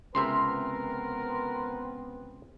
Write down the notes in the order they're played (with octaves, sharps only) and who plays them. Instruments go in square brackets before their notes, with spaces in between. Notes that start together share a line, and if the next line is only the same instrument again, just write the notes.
[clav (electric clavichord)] C#2 C3 E5 [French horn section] B3 C4 B4 [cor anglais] A#4 [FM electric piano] C6